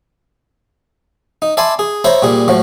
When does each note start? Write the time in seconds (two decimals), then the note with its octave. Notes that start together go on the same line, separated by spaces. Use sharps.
1.42 D#4
1.57 D5 E5 G#5 A5 B5 C6
1.79 G#4
2.04 C5 C#5 E5 A#5 B5
2.23 A#2 G3 G#4
2.48 A2 F3 F#3